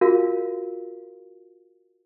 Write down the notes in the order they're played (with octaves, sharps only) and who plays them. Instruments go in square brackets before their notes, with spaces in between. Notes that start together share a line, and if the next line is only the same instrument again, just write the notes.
[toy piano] F4 F#4 G#4 A#4 F5